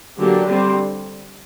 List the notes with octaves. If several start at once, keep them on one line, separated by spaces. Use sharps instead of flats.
D3 F#3 A#3 D4 G4
D3 G3 C4